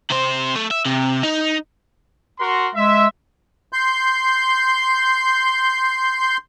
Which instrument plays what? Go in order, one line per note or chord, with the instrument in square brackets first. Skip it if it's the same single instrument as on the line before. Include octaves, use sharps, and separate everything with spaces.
[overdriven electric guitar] C3 C5
A3
E5
C3
D#4
[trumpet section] F#4 A#4 C6
[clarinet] G#3 [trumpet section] E5
[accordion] C6 G6